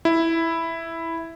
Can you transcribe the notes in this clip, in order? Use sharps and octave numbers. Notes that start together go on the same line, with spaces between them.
E4